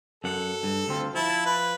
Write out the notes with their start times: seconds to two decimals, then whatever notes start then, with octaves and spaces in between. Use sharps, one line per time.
0.24 F#2 A4 F#5
0.63 G2
0.88 D2 C4 F4
1.15 F3 E4 A5
1.46 B4